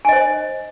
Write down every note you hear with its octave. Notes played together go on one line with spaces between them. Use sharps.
C5 D#5 G#5